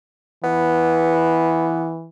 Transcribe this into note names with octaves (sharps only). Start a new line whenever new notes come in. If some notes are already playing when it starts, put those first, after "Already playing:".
E3 B3